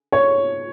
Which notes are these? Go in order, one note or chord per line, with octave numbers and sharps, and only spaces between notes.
C#5